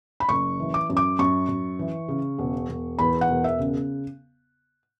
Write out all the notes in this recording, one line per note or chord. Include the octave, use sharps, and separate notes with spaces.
B5
F#1 C#6
E3
D6
F#2
D6
F#2 C#6
F#2
E3
C#3
E1
E1
E2 B5
F#5
E1
E5
C#3